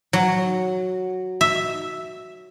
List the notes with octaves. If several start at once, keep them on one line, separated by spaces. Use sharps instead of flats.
F#3
E5